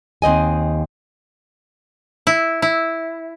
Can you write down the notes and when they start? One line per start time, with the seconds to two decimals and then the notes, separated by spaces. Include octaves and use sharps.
0.22 D#2 C4 D#5 G#5
2.27 E4
2.62 E4